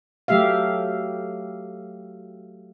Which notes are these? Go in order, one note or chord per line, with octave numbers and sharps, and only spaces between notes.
F#3 A3 G4 E5 F5